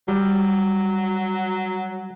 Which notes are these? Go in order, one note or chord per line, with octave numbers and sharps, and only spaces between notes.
F#3 G3